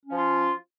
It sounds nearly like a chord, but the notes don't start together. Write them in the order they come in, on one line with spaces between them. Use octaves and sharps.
C#4 F3 F4